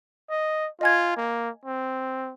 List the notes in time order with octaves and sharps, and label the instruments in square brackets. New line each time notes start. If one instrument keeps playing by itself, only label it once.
[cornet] D#5
[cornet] F4 [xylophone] D#5 G#5 G#6
[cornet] A#3
C4